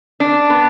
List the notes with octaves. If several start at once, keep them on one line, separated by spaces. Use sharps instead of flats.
D4
B3